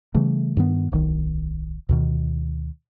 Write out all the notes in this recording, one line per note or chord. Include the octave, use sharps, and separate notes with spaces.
C#3 E3 G3 A3
G2 D#3 B3
D1 B1 D#3
D2 B2 D#3